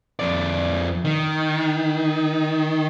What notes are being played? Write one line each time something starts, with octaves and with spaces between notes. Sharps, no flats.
F2 D5
D#3